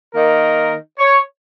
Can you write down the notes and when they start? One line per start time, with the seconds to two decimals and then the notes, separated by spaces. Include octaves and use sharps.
0.15 D#3 A#3 D#4 A#4
0.99 C#5